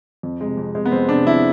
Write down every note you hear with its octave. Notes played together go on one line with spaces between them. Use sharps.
F2
C3 G#3
F2
C3 G#3
B3
F2 C4
C3 G#3 D4
F2 E4